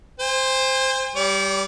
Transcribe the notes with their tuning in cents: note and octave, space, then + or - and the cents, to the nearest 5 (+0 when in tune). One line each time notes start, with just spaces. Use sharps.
C5 +0 G#5 -45
G3 +0 D5 -40